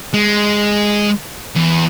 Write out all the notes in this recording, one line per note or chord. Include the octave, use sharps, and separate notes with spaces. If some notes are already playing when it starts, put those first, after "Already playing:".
G#3
E2